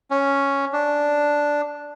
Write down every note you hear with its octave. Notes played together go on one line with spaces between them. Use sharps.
C#4
D4